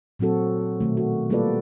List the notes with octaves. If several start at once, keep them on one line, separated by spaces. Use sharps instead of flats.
A#2 F#3 C4 F#4 A4
B2 D#3 A3
F#4
G3 A#3 F4 A4 B4 D5